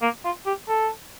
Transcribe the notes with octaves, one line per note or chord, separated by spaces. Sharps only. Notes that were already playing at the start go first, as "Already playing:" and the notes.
A#3
F4
G4
A4